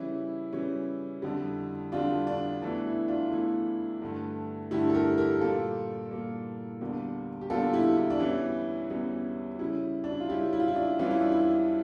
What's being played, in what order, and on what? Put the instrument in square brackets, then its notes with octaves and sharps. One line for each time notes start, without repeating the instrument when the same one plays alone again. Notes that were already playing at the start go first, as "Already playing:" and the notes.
Already playing: [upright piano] C#3 E3 G3 C#4 E4
C#3 E3 G3 C#4
F2 D3 G3
F2 D3 G3 D4 F4
D4
E2 E3 A3 D4
E4
D4 F4
E2 E3 A3 E4
G2 D3 A3
G2 D3 A3 E4 G4
A4
G4 A#4
G4 A#4
A#2 G3 A#3 F4 A4
A#2 G3 A#3
E2 D3 G3 A#3
G4
E2 D3 G3 A#3 F4 A4
E4 G4
E4
D4
E2 E3 G3 C#4 E4
E2 E3 G3 C#4
C#3 G3 C#4 E4
D4
E4
F4
C#3 G3 C#4 E4 G4
E4
F4
E4
D4
F2 E3 G3 C#4 F4
E4
D4
E4